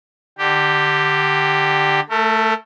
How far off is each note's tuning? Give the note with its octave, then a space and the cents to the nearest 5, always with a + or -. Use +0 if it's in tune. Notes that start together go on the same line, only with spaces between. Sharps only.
D3 +25 G4 +0
A3 +0 A#4 -40